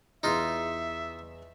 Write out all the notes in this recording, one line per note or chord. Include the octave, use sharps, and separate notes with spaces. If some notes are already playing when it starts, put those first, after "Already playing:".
E2 D#4 F4 G#4 E5 C6